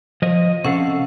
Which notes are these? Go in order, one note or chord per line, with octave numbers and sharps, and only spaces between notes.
F3 D#5
C3 C#4 A4 F5 F#5